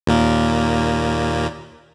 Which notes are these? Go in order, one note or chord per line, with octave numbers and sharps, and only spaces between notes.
D#2 A#2 A#3